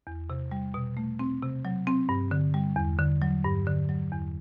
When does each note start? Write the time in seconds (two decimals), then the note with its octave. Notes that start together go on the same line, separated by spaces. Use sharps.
0.07 E2
0.30 C3
0.51 G3
0.74 B2
0.97 A3
1.19 C4
1.43 C3
1.65 F#3
1.87 C4
2.09 G2
2.31 D3
2.54 G3
2.76 E2
2.99 D3
3.22 F#3
3.44 G2
3.67 D3
3.89 F#3
4.12 E2